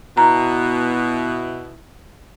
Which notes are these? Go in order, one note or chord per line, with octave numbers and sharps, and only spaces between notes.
B2 E4 A#5